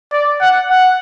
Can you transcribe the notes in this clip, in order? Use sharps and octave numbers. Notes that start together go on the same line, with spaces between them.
D5
F#5
F#5